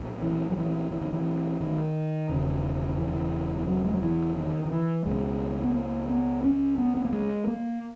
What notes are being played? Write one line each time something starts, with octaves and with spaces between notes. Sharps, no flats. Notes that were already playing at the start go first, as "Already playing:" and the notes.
Already playing: B1 A#2
E3
F#3
E3
E3
D#3
E3
D#3
E1 E2 C#3
E3
D#3
E3
E3
F#3
G#3
F#3
E3
D#3
D#3
E3
C#2 B2 G#3
B3
A#3
B3
C#4
B3
B3
A#3
G#3
A#3